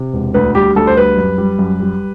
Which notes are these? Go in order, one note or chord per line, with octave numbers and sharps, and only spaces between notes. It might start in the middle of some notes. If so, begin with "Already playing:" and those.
Already playing: C3
E1
D2 B4
G3 G4
D2 A4
C5
G3 B4
F#2
G3
F#2
G3